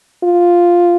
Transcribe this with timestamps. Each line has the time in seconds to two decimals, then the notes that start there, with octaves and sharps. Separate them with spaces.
0.24 F4